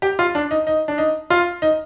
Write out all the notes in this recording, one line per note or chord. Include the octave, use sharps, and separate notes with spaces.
G4
F4
D4
D#4
D#4
D4
D#4
F4
D#4